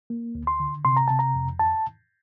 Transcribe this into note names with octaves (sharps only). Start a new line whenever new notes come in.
A#3
D2
C6
D3
C3 C6
A#5
C3 A5
A#5
F2
A5